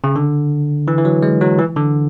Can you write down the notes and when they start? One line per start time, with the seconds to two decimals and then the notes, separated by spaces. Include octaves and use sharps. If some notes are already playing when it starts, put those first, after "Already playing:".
0.04 C#3
0.16 D3
0.88 E3
0.98 E3
1.05 F#3
1.23 G#3
1.41 F#3
1.58 E3
1.76 D3